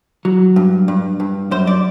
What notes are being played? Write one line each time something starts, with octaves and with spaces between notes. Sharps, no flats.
F#3
G2
G2
G2
F#2 C5
D5